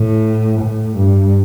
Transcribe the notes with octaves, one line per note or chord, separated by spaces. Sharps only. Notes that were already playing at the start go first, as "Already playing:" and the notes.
Already playing: A2
A2
G2